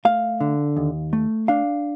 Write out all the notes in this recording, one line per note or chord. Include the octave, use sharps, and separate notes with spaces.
A3 F5
D3
D#2
A3
D4 F5